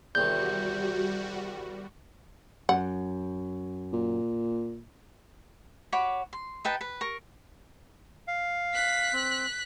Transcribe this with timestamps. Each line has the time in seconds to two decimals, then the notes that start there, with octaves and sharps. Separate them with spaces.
0.15 E2 C3 D#3 G3 F#4 G6
2.69 F#2 F#5
3.93 A#2
5.92 F#4 C#5 B5 D6
6.33 C6
6.65 D#4 B4 G5 A5
6.81 B4
7.01 A#4 C#6
8.28 F5
8.74 F#6 B6
9.13 C4